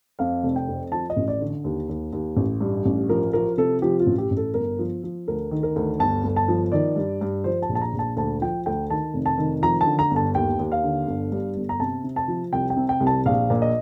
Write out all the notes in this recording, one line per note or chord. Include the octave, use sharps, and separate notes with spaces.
F2 F5
F1
G5
F2
F3 A5
D#5
A1
D5
D3
D#2
D#2
D#2
A1
G2
A1
F3 A#4
F3 A#4
C3 A4
F3 G4
F4
A1
G4
A1
A4
G1 A#4
F3
F3
D2 A#4
D#3
A#4
D2
G1 A5
G1
A5
F3
D#3 D5
G2
G2
F3 C5
A5
A#1
A5
A#5
A#1
A5
D2 A5
F3 G5
D2 G5
D#3 A5
F1
A5
D#3
F3 A#5
A5
D3
A#5
G1
A5
D#2 G5
D#2
F5
D3
G1
G2
G1
A#5
C3 A5
C3
A5
F3
C2 G5
G5
C3
G5
C2
A5
A#1 F5
A#2
D#5